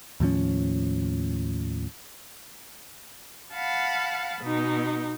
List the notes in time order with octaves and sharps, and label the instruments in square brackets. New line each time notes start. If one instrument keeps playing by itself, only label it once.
[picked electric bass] D#2 A2 F3 C#4
[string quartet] F5 F#5 A5 B5
B2 D#4